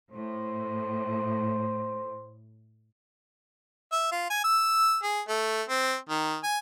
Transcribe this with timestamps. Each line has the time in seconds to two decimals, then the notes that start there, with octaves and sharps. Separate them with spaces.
0.12 A2 C5
3.92 E5
4.12 F4
4.30 G#5
4.44 E6
5.03 G#4
5.28 A3
5.69 C4
6.09 D#3
6.43 G#5